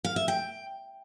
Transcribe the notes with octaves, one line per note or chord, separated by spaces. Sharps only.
F5
E5
G5